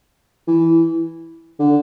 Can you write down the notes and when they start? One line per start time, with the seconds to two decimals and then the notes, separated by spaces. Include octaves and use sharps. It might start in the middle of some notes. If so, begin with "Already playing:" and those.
0.48 E3
1.59 D3